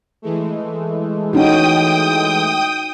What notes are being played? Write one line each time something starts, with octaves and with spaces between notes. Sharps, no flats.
E3 G#3 A3
C#4 D#4 F#4 G5 D#6